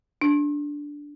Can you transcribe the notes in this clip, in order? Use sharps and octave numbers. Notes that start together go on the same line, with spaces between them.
D4